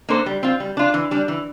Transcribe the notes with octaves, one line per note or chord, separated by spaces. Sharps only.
A#3 D4 A4 C5
G3
C4 F4
G3
D4 F4
E3
G3 D4
E3